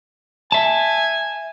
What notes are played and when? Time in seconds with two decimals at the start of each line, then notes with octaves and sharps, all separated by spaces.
0.52 E5 G#5 A5